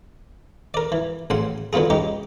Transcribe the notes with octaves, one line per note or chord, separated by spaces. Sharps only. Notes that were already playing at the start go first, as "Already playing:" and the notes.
A#4 D5
E3
A1 C#3 F#5 C6
D3 F#3 B3 F4 G#4
G#3 C#4 D#4 G4